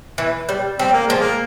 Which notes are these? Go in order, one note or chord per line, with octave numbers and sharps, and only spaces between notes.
E3
G3
G3 C4
A#3
F3 G#3
A#3